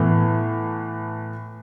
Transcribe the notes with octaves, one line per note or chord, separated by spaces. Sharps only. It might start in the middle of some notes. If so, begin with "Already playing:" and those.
Already playing: A2 E3 B3